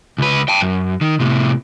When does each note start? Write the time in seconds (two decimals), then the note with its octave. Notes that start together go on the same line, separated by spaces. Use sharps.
0.18 C#2 B4
0.49 G5 A5
0.61 F#2
1.01 D#3
1.20 A2 C3